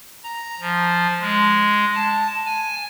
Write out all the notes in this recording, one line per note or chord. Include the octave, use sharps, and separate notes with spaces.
A#5
F3
G#3
A5
G#5